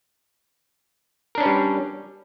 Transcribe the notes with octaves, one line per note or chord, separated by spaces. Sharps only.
G3 C#4 D4 A#4 B4